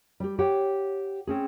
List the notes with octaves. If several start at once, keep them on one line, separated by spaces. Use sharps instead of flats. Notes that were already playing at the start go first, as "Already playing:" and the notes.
G3 G4
G4 C#5 F#5 G5
C4 C#4 G#4